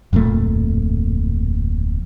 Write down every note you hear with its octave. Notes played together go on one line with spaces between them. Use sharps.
D1 F2 A#2 A3